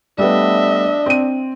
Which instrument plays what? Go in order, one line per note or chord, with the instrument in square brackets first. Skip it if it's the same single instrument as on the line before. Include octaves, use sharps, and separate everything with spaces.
[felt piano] G3 A3 B3 [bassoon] D4 [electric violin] D#5 E5
[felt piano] C4 D#7